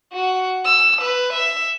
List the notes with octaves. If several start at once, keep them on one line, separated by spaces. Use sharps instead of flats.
F#4
E6
B4
E5